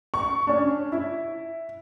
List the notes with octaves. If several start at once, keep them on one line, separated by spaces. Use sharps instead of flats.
C#6
C#4 D4
E4